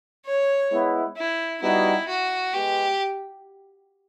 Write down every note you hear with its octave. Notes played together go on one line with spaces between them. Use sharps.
C#5
G#3 B3 E4
E4
G3 B3 D#4 E4 F#4
F#4
G#3 B3 G4